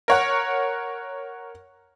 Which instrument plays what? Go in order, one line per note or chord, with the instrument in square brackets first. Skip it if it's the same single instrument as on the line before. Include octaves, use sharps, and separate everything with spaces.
[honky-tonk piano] A#4 C#5 F#5